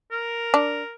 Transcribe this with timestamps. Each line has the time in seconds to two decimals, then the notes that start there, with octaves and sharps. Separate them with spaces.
0.12 A#4
0.54 D4